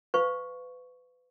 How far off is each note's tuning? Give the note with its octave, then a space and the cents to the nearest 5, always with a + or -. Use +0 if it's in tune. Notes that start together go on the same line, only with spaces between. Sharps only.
B4 +25 F5 +0 C#6 +0